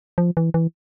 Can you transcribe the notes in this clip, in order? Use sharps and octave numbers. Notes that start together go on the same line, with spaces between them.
F3
E3
E3